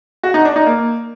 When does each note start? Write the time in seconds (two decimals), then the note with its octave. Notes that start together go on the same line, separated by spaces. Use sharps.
0.23 F#4
0.34 D#4
0.45 D4
0.56 D#4
0.66 A#3